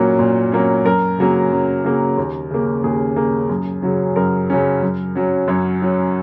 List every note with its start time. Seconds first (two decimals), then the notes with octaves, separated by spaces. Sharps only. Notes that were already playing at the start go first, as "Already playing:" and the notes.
Already playing: A#2 F#3 A#3 C#4
0.19 A#2
0.52 F#3 A#3 C#4
0.85 F#2 A#4
1.18 C#3 F#3 A#3 C#4
1.52 F#2
1.84 C#3 F#3 A#3 C#4
2.18 D#2
2.51 C#3 A#3
2.84 D#2 G#4
3.16 C#3 A#3
3.49 F#2
3.82 C#3 F#3 C#4
4.16 F#2 A#4
4.50 C#3 F#3 C#4
4.82 F#2
5.15 F#3 C#4
5.48 F#2 C#5
5.82 F#3 C#4